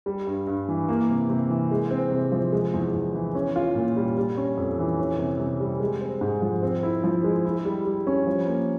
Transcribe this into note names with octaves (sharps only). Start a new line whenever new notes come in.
G3
G2
G2
E3
A#3
C3
C3
E3
G#3
C4
C3
F3
G#3
E2
E2
E3
C#4
F4
A#2
G3
G3
C#4
F2
E3
C#4
C3
C3
G3
G#3
C4
G#2
F3
C4
E4
F3
G#3
E4
G3
G3
C#4
F3
A#3